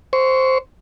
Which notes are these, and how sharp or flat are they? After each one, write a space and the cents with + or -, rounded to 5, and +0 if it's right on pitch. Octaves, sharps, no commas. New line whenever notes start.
C5 +0 C#6 +20